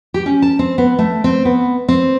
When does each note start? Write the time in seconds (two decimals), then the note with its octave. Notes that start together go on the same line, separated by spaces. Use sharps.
0.14 G4
0.26 C#4
0.42 A5
0.59 C4
0.78 B3
0.99 A3
1.24 C4
1.45 B3
1.88 C4